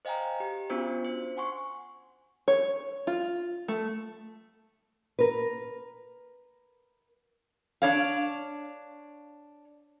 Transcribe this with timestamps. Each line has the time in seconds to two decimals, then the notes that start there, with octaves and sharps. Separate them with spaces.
0.05 C5 D#5 F5 G5 G#5 A#5
0.40 G4
0.70 B3 C#4 D4 F4 F#4 C5
1.05 C5
1.37 F#5 G#5 C6 C#6
2.48 C#5
3.07 F4
3.68 A3
5.19 A#4 B4
7.82 D4 C#5 F5